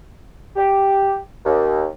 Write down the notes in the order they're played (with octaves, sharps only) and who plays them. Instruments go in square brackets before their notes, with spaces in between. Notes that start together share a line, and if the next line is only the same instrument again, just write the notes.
[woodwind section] G4
D#2